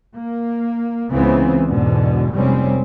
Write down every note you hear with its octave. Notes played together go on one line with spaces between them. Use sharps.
A#3
C#2 C#3 E3 B3 C4
E2 G#2 B2 D3
F1 C3 G3 G#3 C4 C#4